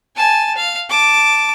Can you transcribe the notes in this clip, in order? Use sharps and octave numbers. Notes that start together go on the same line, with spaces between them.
G#5 A5
F5
A5 D6